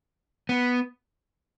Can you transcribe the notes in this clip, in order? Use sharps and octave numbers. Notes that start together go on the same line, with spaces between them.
B3